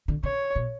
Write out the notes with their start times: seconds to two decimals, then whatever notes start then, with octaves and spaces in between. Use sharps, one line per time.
0.08 D3
0.23 C#3 C#5
0.56 B2